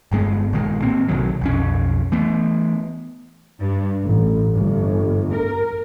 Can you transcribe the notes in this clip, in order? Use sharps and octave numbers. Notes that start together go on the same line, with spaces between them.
G1 G2 G#3 B3
A#1 A#2 D#3 G#3
A2 A#3 C4
B1 C3 D#3 F#3
B1 F2 C#4
E3 A3 B3
G2
A1
G1
A#4